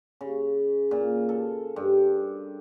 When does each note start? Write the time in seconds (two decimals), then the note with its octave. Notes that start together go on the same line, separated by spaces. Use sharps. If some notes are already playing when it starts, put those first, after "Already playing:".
0.21 C#3
0.91 A#2
1.29 A4
1.76 G2